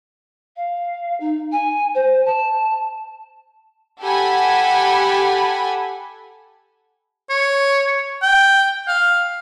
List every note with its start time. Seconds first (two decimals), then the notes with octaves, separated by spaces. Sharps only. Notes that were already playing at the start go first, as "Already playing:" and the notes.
0.56 F5
1.20 D#4
1.52 G#5
1.95 C5
2.25 A5
4.02 G4 A4 F#5 G#5 B5
7.30 C#5
8.23 G5
8.88 F5